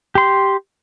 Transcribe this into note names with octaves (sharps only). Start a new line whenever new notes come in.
G4 C6